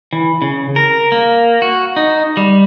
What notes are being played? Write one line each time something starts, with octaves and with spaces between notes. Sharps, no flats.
E3
C#3
A#4
A#3
F#4
D#4
G3